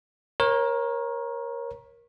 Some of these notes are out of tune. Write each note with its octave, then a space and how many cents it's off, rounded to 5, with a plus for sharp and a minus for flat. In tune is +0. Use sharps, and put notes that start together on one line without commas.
A#4 +20 C#5 -25